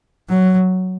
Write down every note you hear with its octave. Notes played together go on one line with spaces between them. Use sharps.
F#3